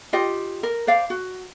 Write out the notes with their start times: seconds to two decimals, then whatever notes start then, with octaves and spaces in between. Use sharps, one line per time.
0.13 F4 G4 D#5
0.63 A#4
0.87 C5 D5 F5
1.10 F#4